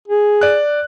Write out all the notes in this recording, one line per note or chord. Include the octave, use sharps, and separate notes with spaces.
G#4
D5 F#6